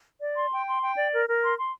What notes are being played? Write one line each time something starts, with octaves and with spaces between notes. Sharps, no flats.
D5
C6
G5
C6
G5
D5
A#4
A#4
C6
C6